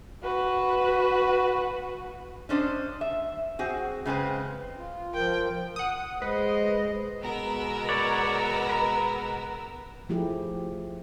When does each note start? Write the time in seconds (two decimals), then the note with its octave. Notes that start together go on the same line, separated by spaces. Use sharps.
0.23 F#4 B4
2.49 C#4 D4 C5 D#5
3.01 E5
3.59 C4 F#4 G#4
4.05 C#3 G#3 C4 B4
4.77 F4
5.14 F3 A#4 G5
5.76 F#5 D#6
6.22 G#3 B4 C5 D#5
7.23 B2 G#3 B3 A#4 E6
7.89 B4 C#5 D5
8.69 B4 A#5
10.09 F3 A3 E4 G4 G#4